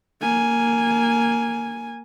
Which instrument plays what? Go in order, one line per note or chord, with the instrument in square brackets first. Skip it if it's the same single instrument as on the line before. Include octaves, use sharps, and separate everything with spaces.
[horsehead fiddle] A#3 G#5